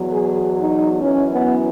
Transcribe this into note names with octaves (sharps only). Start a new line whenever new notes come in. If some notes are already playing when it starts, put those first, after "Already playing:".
Already playing: E2 B2 F#3
G#4
D#4
F#2 E3 C#4
B3